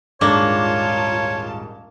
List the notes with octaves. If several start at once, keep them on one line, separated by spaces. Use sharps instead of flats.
D#1 G#2 A#3 D4 F4 C#5 A5